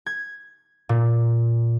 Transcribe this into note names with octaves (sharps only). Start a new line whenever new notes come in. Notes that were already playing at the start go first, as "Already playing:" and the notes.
G#6
A#2